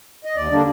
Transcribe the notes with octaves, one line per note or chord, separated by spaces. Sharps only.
D#5
D#2 D5
D3 G3 A#3 D4